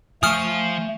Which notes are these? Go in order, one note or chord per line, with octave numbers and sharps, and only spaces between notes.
F3 A3 F4 G#5 C#6 D#6 F6